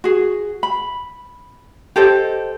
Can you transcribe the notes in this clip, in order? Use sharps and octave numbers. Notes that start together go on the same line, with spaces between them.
F#4 G#4
B5
G4 A4 C5 D#5